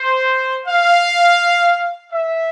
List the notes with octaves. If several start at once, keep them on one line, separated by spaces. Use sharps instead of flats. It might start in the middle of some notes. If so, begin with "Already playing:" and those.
Already playing: C5
F5
E5